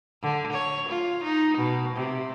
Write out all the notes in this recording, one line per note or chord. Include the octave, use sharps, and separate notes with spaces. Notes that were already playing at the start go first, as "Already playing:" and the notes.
D3
C#5
F4
D#4
B2
C3